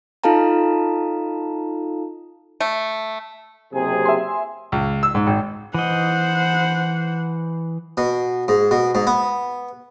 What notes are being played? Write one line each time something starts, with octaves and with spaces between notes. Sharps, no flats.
D#4 F4 A4 F5 A5 A#5
A3
F#1 C3 G#4
E5 G#5 C6
C#2
E6
G#2
G#1
E3 C5 D#5 F#5
B2
G#2
B2
G#2
B3